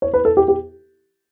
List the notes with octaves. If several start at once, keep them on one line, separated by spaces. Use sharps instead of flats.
C#5
B4
A4
G4
G4